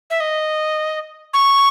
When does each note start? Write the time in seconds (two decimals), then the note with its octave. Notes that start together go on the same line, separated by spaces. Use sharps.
0.10 E5
0.20 D#5
1.34 C#6